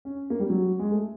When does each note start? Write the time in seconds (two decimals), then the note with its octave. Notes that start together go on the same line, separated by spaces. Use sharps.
0.05 C#4
0.30 A#3
0.40 G3
0.50 F#3
0.79 G#3
0.92 A3